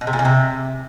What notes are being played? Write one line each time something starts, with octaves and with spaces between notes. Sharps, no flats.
B2
C3
A#2
C#3
C3